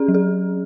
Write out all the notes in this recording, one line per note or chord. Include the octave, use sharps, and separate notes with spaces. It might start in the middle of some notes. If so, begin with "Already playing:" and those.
Already playing: C#4 G#4
F#3
G#4